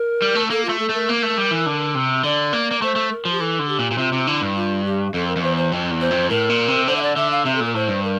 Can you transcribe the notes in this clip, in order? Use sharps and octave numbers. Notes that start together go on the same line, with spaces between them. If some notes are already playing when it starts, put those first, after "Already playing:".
Already playing: A#4
G3
A3
A#3 A4
A3 F4
A4
A3 A#4
A#3
A3
G3
E3
D3
C3
D3 D5
A#3
A#3
A3 C5
A3
A#4
F3
G4
E3 A4
D3
G4
A#2
A#2
C3 F4
C3
D3 E4
G2
F4
G4
F2 A4
A#4
F2
E2 C5
C5
F2
E2
C5
F2
A2 A#4
A#2
C3
D3 C5
E5
D5
D3 E5
F5
C3 E5
A4
A#2 A#4
A2 C5
G2
A#4